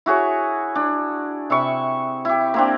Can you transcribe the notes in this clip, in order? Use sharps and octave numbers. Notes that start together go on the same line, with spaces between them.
E4 F#4 G#4 C#5
D4
C3 E5 B5 C#6
E4 G4
A#3 C4 D4